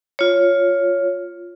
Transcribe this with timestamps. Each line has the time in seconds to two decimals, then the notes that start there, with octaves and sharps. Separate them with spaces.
0.19 F4 C#5